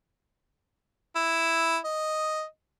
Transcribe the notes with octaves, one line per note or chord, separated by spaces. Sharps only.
E4
D#5